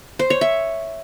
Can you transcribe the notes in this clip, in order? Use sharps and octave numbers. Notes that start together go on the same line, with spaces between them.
C5
C#5
E5